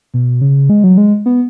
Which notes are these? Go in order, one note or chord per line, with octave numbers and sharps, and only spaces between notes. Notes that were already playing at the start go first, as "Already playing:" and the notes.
B2
C#3
G#3
F#3
G#3
B3